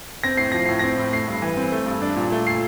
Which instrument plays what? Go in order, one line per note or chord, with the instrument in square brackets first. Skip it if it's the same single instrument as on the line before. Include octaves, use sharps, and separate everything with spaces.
[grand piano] C4 A#6
A2 C7
F3 A#6
A2 C7
C4 A#6
A2
A3 C7
G2
E3
C4
A3
G2
D4
A#2
A3
A#2 C7